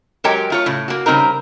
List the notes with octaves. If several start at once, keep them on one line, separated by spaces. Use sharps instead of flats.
F#3 G#3 G4 A#4 C#5 G5
A3 F4 C#5
A2 C#3
A#3 F#4
C#3 G3 C4 D#4 A#4